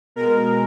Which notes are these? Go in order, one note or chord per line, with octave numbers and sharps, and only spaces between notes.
B2 G#3 A#4